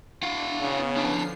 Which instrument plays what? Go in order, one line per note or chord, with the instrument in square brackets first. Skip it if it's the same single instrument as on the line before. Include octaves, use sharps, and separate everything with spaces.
[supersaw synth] D4 [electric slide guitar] E4 F5 F#5
[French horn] C#3 [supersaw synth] B3 C#4
[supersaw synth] D3 F3 C7 [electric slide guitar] D4 E4 A5